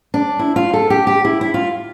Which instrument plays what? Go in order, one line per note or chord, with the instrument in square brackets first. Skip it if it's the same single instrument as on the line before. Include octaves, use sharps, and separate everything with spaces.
[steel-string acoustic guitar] D4
E4
F4
A4
G4
G4
E4
E4
F4